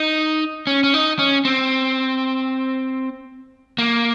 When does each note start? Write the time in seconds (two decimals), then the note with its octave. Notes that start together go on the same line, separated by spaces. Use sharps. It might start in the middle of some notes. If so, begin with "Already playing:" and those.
Already playing: D#4
0.67 C#4
0.84 C#4
0.94 D#4
1.19 C#4
1.45 C4
3.78 A#3